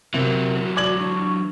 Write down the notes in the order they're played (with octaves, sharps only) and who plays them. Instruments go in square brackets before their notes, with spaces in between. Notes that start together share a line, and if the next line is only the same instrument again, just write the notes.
[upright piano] C3 [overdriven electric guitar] E3 F#3 [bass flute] A#4
[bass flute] F#4
[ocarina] D5 [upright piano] D6 G#6 F#7
[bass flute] D4 [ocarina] C#6